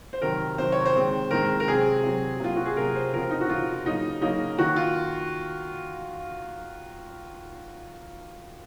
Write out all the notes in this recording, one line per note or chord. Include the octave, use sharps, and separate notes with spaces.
C5
C3 D#3 F#3 A#4
C3 D#3 F#3 C5
C#5
C5
D#3 G#3 C4
D#3 G#3 C4 A#4
A#4
C3 F#3 C4 G#4
C3 F#3 C4
C3 F#3 A#3 F4
F#4
G#4
C3 F#3 A#3 A#4
C5
C#3 F3 C4 A#4
D#4
F#4
C#3 F3 C4 F4
C#3 F#3 A#3 D#4
C#3 F#3 A#3 D#4
D#3 A#3 F#4
F4